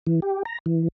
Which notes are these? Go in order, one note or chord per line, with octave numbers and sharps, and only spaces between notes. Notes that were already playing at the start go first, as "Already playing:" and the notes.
E3
G4
A#5
E3